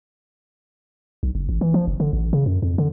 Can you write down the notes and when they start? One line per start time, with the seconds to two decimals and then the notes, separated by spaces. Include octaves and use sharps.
1.23 B1
1.35 F#1
1.49 A1
1.61 E3
1.74 F3
1.87 F#1
2.00 D3
2.13 A1
2.33 C#3
2.46 F#2
2.62 F2
2.78 D3